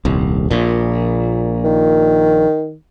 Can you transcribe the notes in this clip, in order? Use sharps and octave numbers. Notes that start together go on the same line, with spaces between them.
D#1 C2
A#1 A#2
D#3